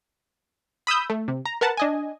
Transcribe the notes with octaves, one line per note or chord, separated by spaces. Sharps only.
B5 D#6 E6 G6
A3
C3
A#5
A#4 B4 F#5 A5
D4 D#5 G#5